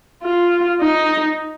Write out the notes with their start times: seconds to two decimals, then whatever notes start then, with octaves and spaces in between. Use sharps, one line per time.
0.23 F4
0.81 D#4